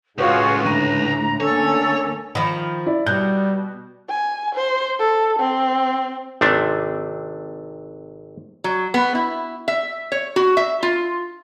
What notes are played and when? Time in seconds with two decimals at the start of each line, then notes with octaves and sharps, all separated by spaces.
0.18 C#2 A2 F4 F#4 G#4 B4 C#5 F#5
0.65 D2 A#5 F#6 D#7
1.40 D3 A#3 C#4 A4 C#5
2.35 D#3 F3 B5
2.86 E4 D5
3.06 B2 G3 F#6 G6
4.09 G#5
4.55 C5
4.99 A4
5.39 C4
6.41 G#1 C3 A3 D4
8.64 F#3
8.94 B3
9.15 E4
9.68 E5
10.12 C#5
10.36 F#4
10.57 E5
10.83 F4